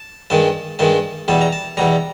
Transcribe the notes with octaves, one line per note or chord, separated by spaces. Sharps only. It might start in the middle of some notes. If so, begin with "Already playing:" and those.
Already playing: A5
G2 D#3 G#3 A5
G2 D#3 G#3 A5
E2 B2 G3 A5
A#5
A5
E2 B2 G3 A#5